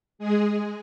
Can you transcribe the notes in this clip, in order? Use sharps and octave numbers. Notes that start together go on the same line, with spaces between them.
G#3 G#4